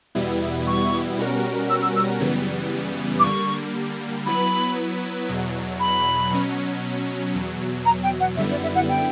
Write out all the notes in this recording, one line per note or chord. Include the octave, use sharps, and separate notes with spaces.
E2 B2 G3 B3 E4
C#6
B2 G3 C#4 F#4 A#4
E6
E6
E6
F#2 C#3 E3 G3 B3
D6
D3 G3 A#3 C#6
F#3 B3 E4 B4 B5
E2 B2 F#3
B5
B2 F#3 C#4
E2 B2 F#3
A#5
G5
F#5
F#2 D3 G3 B3 E4 E5
D5
E5
F#5
G5